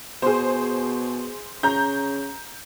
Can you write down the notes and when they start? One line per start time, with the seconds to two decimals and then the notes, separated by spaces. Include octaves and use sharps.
0.22 B2 G#4 C5
1.63 C#3 A#5 G6